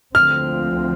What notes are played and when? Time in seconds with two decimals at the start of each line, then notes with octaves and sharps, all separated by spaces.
0.15 D2 D3 F3 C4 F6